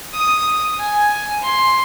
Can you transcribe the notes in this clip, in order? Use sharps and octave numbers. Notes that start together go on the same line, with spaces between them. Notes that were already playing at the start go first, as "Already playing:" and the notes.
D#6
G#5
C6